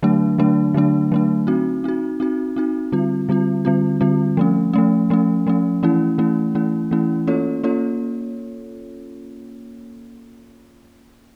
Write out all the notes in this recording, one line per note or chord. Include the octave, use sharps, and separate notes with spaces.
D3 F#3 A3 D4
D3 F#3 A3 D4
D3 F#3 A3 D4
D3 F#3 A3 D4
C4 D#4 F#4
C4 D#4 F#4
C4 D#4 F#4
C4 D#4 F#4
D3 G3 C4 F4
D3 G3 C4 F4
D3 G3 C4 F4
D3 G3 C4 F4
F3 A3 C#4
F3 A3 C#4
F3 A3 C#4
F3 A3 C#4
E3 A3 C#4 E4
E3 A3 C#4 E4
E3 A3 C#4 E4
E3 A3 C#4 E4
A#3 C#4 F4 A4 C#5
A#3 C#4 F4 A4 C#5